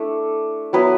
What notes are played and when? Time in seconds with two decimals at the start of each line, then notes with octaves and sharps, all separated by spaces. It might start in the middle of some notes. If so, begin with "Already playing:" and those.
Already playing: A3 D4 E4 A4
0.73 F#3 B3 E4 B4